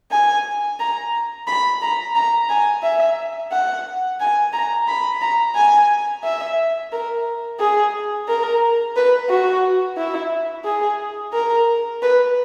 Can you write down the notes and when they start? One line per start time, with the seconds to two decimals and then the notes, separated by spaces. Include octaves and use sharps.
0.12 G#5
0.80 A#5
1.47 B5
1.82 A#5
2.16 A#5
2.49 G#5
2.83 E5
3.52 F#5
4.20 G#5
4.53 A#5
4.88 B5
5.22 A#5
5.56 G#5
6.24 E5
6.92 A#4
7.60 G#4
8.28 A#4
8.96 B4
9.29 F#4
9.97 E4
10.65 G#4
11.34 A#4
12.02 B4